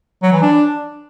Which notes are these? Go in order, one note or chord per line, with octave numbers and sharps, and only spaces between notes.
F#3
E3
D4